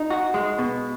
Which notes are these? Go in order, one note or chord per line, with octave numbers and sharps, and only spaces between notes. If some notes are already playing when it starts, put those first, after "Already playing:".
Already playing: D#4
F#4
G#3
B2